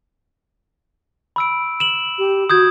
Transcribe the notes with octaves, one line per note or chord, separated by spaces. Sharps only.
B5 E6 D7
E7 F#7
G4
F#4 D#6 G6 G#6